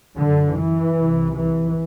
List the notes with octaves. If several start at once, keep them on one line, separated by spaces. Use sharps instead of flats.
F#2 D3
E3
C2 C3
E3